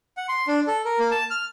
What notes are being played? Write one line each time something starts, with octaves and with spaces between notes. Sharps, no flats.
F#5
C6
D4
A4
A#4
A#3
A5
F6